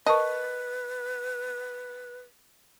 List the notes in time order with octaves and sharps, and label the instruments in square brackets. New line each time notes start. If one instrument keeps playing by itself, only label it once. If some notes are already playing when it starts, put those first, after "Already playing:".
[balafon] A#4 A5 C#6 [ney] B4 [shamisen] D#5